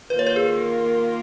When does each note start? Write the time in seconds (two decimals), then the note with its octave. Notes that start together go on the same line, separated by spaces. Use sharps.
0.10 D#3 A#3 F4 A#4 B4
0.19 C#5
0.26 B4
0.36 G#4